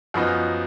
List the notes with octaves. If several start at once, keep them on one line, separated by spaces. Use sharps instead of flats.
F#2 F3 B3 D#4